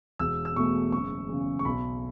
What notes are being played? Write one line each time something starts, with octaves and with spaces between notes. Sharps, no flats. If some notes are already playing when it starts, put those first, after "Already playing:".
E1 E6
E6
E2 B2 A3 C#6
F#1 C#6
E2 C#3
C#6
B1 B5